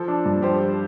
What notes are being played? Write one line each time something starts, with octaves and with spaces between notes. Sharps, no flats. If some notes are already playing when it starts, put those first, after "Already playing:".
Already playing: F3 A4
D4
G2
F3 G4 C5
F3